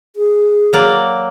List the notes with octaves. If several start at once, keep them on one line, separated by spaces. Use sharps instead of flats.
G#4
F#3 A#3 D5